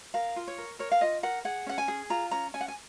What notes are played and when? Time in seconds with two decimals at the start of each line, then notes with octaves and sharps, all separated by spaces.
0.14 A#4 F5
0.36 F4
0.47 C#5
0.58 A#4
0.79 A#4 C#5
0.92 F5
1.01 F4 D#5
1.23 A#4 F#5
1.45 G#4 F#5
1.66 C#4 F#5
1.78 G#5
1.88 G#4
2.10 F4 A#5
2.31 C#4 A#5
2.54 C#4 G#5
2.61 F#5
2.68 G#5